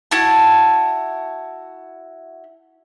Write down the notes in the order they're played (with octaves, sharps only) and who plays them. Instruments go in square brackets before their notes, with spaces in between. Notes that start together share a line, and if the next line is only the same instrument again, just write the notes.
[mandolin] E4 F#4 A5